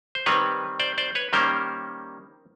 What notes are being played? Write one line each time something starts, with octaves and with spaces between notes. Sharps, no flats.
C5
D#3 G3 C4 B4 C#5
C5 D5
C5 D5
B4 C#5
D#3 G3 A#3 C#4 A#4 C5